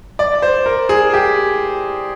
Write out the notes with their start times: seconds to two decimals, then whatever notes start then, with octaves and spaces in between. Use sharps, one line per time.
0.19 D5
0.42 C5
0.66 A#4
0.89 G#4
1.14 G4